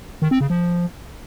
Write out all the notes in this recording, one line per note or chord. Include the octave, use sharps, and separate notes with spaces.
D#3
C4
C#3
F3